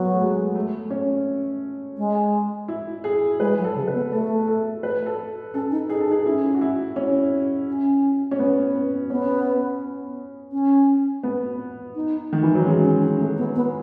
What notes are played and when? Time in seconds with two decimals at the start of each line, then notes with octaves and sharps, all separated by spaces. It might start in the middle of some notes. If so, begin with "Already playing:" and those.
Already playing: F#3 B3
0.12 A3
0.20 G#3
0.55 A3
0.90 C#4
1.98 G#3
2.68 E4
3.04 G#4
3.40 G#3 B4
3.59 F#3
3.64 A4
3.75 C#3
3.88 B4
3.94 B3
4.12 A3 A4
4.47 A4
4.83 B4
5.06 A4
5.54 C#4 A4
5.71 D#4
5.89 D#4 G#4
6.00 A4
6.08 D#4
6.11 G#4
6.25 C#4 E4
6.54 F#4
6.61 E4
6.96 C#4
7.68 C#4
8.31 C#4
8.39 B3
8.75 B3
9.10 B3 C#4
10.52 C#4
11.23 B3
11.95 D#4
12.33 D#3
12.43 E3
12.55 F#3
12.66 G#3 C#4
12.84 C#4
13.02 C#4
13.19 A3
13.38 B3
13.55 B3